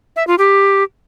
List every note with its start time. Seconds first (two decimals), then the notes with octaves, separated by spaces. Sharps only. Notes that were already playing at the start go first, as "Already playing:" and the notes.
0.16 E5
0.27 F4
0.38 G4